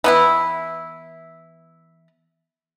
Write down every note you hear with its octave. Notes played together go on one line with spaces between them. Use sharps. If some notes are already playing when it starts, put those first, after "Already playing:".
E3 B3 E4